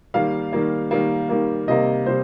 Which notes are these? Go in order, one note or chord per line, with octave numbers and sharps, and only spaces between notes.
D#3 G3 A#3 F5
D#3 G3 A#3
D#3 G3 A#3
D#3 G3 A#3
C3 G3 A#3 D#5
C3 G3 C5